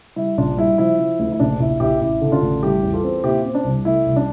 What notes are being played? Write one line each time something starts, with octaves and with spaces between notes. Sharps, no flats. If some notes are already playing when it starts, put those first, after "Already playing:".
G3 E4
A#1 D4 F4
G3 E4
F3 E4
F3
D2
E4
A#1 D4
A#1 E4
A#1 E4 G4
A1 E4
D3
D4 F4
A1
G3 E4 G4
E2
F4 A4
C4
A#2 E4 G4
C4
D4
C2
A3 E4
C2
D4